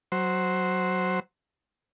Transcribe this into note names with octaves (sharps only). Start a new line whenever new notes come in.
F#3 C5